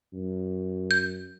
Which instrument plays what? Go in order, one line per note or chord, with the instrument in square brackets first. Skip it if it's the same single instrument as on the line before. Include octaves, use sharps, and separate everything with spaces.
[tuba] F#2
[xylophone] G6